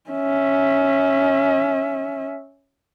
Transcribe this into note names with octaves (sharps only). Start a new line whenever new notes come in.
C#4 E5